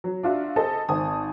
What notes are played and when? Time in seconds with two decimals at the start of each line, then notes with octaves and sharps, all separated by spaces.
0.04 F#3
0.23 D4 F4 F#4 E5
0.56 G#4 A4 C5 D#5 A5
0.89 G#1 C4 G#5 A5 D#6